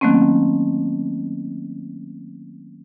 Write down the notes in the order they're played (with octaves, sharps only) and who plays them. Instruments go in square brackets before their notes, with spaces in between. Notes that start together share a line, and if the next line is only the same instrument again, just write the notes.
[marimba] D#3 F#3 A3 A#3 C4 C#4